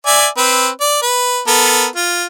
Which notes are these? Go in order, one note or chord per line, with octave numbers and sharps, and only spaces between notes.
D5 E5 G#5
C4 B4
D5
B4
B3 A4 A#4
F4